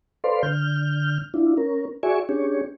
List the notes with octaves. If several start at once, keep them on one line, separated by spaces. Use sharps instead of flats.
A4 B4 C5 D5 F5 C6
D3 F6 G6
D4 E4 F4
C#4 A#4
F#4 G#4 D5 E5 G#5 C#6
C#4 D4 G4 G#4 C#5